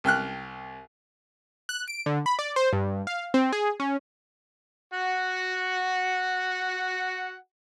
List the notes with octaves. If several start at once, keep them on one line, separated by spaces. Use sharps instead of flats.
C2 G5 F6 F#6
F#6
D7
D3
B5
D5
C5
G2
F5
C4
G#4
C#4
F#4 F#5